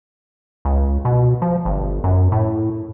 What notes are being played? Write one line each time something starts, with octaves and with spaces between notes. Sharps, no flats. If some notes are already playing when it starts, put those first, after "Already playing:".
C#2
B2
F3
G1
F#2
A2